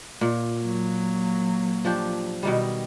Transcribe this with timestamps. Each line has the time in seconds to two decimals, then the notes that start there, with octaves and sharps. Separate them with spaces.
0.21 A#2
0.57 F#3 A#3
1.85 F3 D4 G4
2.43 B2 D#3 G3